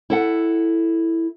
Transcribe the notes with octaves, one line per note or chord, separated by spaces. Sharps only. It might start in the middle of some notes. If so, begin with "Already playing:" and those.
E4 A4 F#5